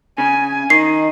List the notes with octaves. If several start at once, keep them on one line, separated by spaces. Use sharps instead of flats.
C#3 G#5
D#3 D#5 C7